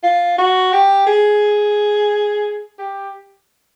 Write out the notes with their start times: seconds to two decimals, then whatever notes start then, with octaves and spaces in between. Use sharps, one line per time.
0.03 F4
0.38 F#4
0.73 G4
1.07 G#4
2.79 G4